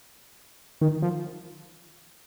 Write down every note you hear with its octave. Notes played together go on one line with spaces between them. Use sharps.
D#3
F3